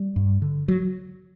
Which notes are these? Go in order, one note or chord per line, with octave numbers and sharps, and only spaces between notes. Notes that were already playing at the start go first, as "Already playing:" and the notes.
Already playing: G3
G2
D3
F#3